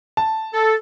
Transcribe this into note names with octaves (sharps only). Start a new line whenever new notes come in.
A5
A4